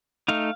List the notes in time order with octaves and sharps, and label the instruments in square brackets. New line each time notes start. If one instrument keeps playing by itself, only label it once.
[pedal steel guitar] A3 D#4 F5